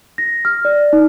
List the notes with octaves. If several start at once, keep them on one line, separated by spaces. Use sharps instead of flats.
A#6
F6
D5
D#4